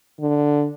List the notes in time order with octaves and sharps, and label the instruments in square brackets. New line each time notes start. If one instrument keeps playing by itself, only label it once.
[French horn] D3